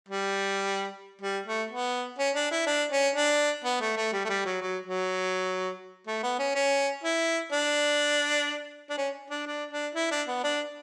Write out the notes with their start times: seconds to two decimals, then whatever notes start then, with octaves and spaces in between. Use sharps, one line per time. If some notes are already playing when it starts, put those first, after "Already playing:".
0.09 G3
1.22 G3
1.46 A3
1.71 B3
2.19 C#4
2.35 D4
2.51 E4
2.67 D4
2.92 C#4
3.16 D4
3.64 B3
3.81 A3
3.97 A3
4.13 G3
4.25 A3
4.29 G3
4.45 F#3
4.61 F#3
4.86 F#3
6.07 A3
6.23 B3
6.39 C#4
6.55 C#4
7.04 E4
7.52 D4
8.90 D4
8.97 C#4
9.30 D4
9.47 D4
9.71 D4
9.95 E4
10.11 D4
10.28 B3
10.44 D4